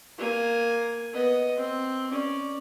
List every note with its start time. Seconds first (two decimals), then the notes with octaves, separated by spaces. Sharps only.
0.18 A#3 G#5
1.13 B3 D#5
1.57 C4
2.10 C#4 D5